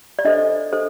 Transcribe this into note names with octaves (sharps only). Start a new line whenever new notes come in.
D5
D4 A4 C5 D#5
D4 A4 C5